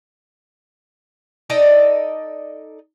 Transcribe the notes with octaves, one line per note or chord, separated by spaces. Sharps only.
D#4 A4 D5 D#5